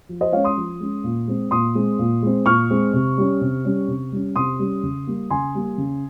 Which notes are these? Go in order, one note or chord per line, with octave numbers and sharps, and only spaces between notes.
F3
C5 D#5
G#3 C#4 C#5 F5
C6 D#6
F3
G#3 C#4
A#2
G#3 C4
A#2 C6 D#6
G#3 C4
A#2
G#3 C4
A#2 C#6 F6
G#3 C4
C3
G3 C#4
C3
G3 C#4
C3
G3 C#4
C3 C6 D#6
G3 C#4
C#3
G3 A#3
C#3 G#5 C6
G3 A#3
C#3